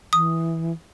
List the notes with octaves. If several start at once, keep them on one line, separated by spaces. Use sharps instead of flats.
E3 D#6